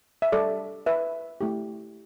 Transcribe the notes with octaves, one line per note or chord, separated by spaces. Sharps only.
E5
G3 D4 G4 A4 D5
B4 E5
A3 E4 G4